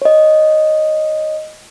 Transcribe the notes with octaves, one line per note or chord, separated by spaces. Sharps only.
C#5 D#5